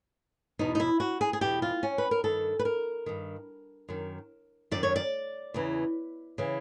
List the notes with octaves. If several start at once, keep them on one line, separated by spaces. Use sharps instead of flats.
E2 B2 D#4
D#4
E4
F#4
G#4
G#4
E2 B2 G4
F4
C#4
B4
A#4
G2 D#3 A4
B4
A#4
G2 D#3
F#2 D#3
F#2 D#3 D5
C#5
D5
E2 C#3 E3
C#3 E3